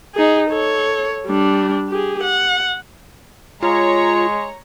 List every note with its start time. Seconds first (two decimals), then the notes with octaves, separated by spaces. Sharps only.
0.15 D#4 G#4
0.50 A4 C#5
1.26 G3 D4
1.89 G4 G#4
2.23 F#5
3.63 G#3 F4 C#5 A#5